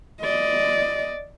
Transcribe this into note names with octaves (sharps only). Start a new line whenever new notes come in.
D5 D#5